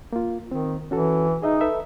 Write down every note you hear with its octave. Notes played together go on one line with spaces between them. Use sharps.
A#3 F4
D#3 C4
E3 C#4 F#4 A4
D#4 G#4 D#5 E5
A4 B4 E5